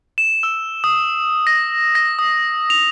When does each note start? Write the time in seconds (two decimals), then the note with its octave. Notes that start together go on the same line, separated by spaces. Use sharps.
0.18 E7
0.43 E6
0.84 D#6
1.47 A#6
1.95 A#6
2.19 D#6
2.70 F7